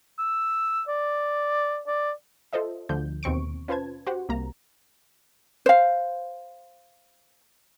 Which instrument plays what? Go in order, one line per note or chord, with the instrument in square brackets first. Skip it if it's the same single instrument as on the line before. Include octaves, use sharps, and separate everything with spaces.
[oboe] E6
D5
D5
[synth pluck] F4 A4 C5 D#5 E5
D2 D3 F3 G6
D#2 B2 C4 C#6 D7
C#4 F4 B4 C5 A5 G#6
F#4 G4 C5 F#5
C2 A#3 A#5
[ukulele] C5 F5